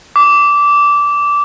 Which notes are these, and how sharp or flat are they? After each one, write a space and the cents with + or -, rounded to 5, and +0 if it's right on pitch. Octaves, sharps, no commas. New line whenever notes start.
D6 -15